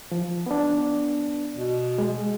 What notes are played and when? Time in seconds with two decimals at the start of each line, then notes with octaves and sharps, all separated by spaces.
0.11 F3
0.46 B3 D4
1.56 B2
1.98 G#3